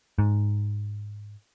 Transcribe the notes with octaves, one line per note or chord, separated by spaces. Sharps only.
G#2